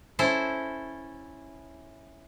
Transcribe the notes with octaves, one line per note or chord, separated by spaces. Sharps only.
C#4 E4 A4 C5